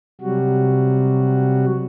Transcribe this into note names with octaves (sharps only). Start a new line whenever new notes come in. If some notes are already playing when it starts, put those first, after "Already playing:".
C3 F#3 G3 F#4